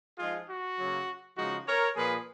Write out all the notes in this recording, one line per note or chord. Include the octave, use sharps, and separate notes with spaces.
F3 G#3 D#4 F4 G#4
F#4
C#3 F#3 A#3
C#3 F3 G#3 D#4 F#4
A#4 C#5
A#2 F3 A#3 G#4 B4